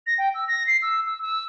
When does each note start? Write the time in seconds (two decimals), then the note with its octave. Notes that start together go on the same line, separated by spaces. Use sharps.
0.07 A#6
0.18 G5
0.35 E6
0.48 A#6
0.67 C7
0.82 E6
1.06 E6
1.22 E6